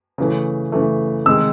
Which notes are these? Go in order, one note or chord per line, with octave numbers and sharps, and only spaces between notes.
C#3 E3 A3
C#3 E3 A3
C3 D#3 G#3 E6